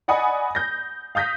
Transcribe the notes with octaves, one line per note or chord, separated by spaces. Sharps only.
D5 D#5 F#5 G#5 B5 D#6
G6 A#6
F5 D#6 G6 A#6 B6